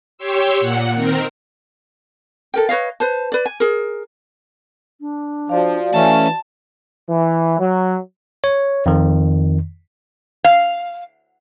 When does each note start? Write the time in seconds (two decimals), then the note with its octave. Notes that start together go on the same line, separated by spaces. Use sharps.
0.18 G4 C#5 C6 E6
0.57 A#2 F#5 C#7
0.94 D#3 C4 A#4
2.54 A4 A#4 G5
2.69 B4 C#5 D#5 F5
3.00 B4 C5 A5
3.32 B4 D5
3.46 G#5
3.60 G#4 A#4
5.01 D4
5.49 F3 F#4 D5 F5
5.93 E3 A3 C#4 A5
7.09 E3
7.59 F#3
8.44 C#5
8.86 F2 D#3
10.44 F5